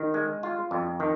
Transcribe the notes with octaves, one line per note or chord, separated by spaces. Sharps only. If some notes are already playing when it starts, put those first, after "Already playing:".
Already playing: D#3
G#3
F4
F2
D#3